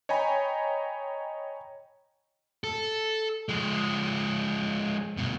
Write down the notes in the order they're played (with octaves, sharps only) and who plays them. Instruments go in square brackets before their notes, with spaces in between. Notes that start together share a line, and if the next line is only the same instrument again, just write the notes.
[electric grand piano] C#5 D#5 G5 G#5 A#5 B5
[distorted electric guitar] A4
F3 G#3
G2 B2